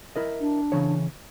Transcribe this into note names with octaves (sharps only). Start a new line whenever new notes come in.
E4 A#4 D#5
D4
C#3 E3 C#5